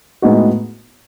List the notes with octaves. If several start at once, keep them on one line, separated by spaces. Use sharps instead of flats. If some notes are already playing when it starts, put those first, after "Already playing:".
A2 G#3 B3 D#4 F#4